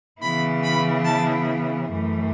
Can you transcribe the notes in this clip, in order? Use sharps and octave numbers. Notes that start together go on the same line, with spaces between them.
C#3 E3 B3 E4 B5
B5
A5
F#2 E3 A3